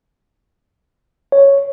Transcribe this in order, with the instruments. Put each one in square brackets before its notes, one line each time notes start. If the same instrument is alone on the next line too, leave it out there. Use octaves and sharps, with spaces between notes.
[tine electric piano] C#5